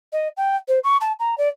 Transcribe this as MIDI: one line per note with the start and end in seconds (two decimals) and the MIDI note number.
0.12 0.28 75
0.37 0.56 79
0.68 0.79 72
0.83 0.97 85
1.01 1.12 81
1.19 1.37 82
1.38 1.48 74